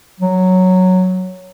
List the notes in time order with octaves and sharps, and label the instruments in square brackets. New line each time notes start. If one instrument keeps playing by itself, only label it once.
[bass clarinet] F#3